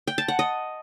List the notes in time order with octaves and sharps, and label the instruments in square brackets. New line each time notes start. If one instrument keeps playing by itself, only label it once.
[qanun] G5
A5
F#5
D#5